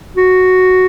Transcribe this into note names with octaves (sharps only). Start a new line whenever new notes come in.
F#4